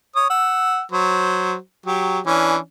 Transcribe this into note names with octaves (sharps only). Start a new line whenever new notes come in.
C#5 D#6
F#5 E6
F#3 C5
F#3 G4
E3 C#4 D4